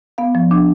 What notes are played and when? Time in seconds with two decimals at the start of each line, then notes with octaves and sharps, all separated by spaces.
0.18 B3 F5
0.35 F3
0.51 D4